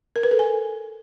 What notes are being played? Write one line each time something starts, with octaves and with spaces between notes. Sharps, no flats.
A#4
B4
A4
G#5